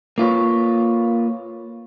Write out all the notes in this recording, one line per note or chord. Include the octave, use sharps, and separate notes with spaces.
A#3 F4 B4 C#5